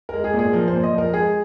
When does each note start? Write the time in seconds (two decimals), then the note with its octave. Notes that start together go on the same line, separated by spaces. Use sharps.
0.09 G#3 A#4
0.24 G#4
0.34 A#2
0.39 G#4
0.53 F3 A#4
0.68 C5
0.73 A#2
0.83 D#5
0.94 F3 A#4
1.13 G#3 G#4